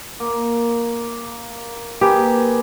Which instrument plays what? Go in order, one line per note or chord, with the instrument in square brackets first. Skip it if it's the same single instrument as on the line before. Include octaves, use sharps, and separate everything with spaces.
[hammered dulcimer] A#3
[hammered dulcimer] A#3 G#4 B4 [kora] G4